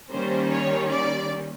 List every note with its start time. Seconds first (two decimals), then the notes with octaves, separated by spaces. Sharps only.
0.11 D#3 G3 A#3 C#4 C5
0.51 C#5
0.91 D5